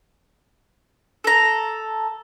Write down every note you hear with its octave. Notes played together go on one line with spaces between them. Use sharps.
A4 A#5